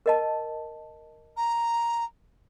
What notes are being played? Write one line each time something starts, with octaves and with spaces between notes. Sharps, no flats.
A#4 D#5 A5
A#5